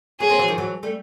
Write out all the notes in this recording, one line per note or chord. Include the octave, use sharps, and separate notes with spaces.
B3 C#4 G#4
A#3 C4
E3 F#3
D#3 F3
E3 F#3
G3 A3